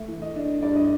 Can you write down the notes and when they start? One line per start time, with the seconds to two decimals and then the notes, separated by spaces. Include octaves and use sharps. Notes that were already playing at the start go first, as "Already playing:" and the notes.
Already playing: A3 E5
0.08 E3
0.22 D#5
0.36 D4
0.63 G2 D5
0.76 D#5